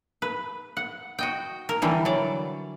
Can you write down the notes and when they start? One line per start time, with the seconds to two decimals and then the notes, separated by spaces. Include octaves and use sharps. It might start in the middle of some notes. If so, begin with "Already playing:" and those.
0.22 B4
0.77 F#5
1.19 F#4 D#5 G5
1.69 A#4
1.82 D3 E3 G3
2.05 F#3 D5